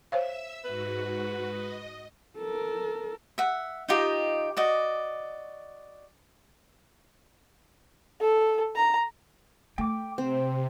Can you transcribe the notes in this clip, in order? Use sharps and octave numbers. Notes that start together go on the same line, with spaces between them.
C5 C#5 E5 F5 E6
G#2 F#4 B4
D#5
A4 A#4
E5 F#5
D#4 F4 G4 D#5
F#4 D5 D#5
A4
A#5
A3 G5 D6
C3 C4 C5